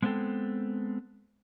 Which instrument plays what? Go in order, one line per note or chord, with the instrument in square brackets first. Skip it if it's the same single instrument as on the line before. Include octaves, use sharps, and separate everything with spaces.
[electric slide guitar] G#3 B3 C4 D4 A4 G5